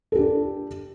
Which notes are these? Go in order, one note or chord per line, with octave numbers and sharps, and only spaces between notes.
D4 G4 A4